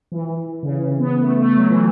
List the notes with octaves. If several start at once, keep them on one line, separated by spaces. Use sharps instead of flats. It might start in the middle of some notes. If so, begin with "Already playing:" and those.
E3
C#3
E3
B3
A3
A3
F#3
E3